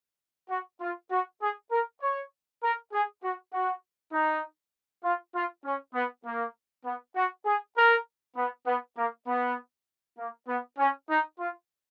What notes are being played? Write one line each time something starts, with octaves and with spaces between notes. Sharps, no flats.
F#4
F4
F#4
G#4
A#4
C#5
A#4
G#4
F#4
F#4
D#4
F4
F4
C#4
B3
A#3
B3
F#4
G#4
A#4
B3
B3
A#3
B3
A#3
B3
C#4
D#4
F4